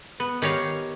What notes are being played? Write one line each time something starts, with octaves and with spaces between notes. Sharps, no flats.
B3
D#3 G4 C#5 F5